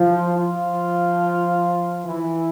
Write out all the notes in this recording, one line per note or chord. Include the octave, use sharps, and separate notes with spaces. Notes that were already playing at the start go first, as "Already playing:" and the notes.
Already playing: F3 F4
F3 F4
E3 E4